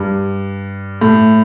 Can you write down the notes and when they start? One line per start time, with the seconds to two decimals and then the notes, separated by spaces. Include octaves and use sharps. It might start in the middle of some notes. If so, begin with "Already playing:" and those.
Already playing: G2
1.01 A2